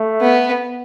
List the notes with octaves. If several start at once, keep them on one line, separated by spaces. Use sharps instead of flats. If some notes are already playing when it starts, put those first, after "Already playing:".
Already playing: A3
B3